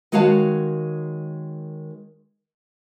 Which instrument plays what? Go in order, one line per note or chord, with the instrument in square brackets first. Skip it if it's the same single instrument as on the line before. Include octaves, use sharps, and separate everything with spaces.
[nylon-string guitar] D#3 G#3 F#4 C#5 F5 A5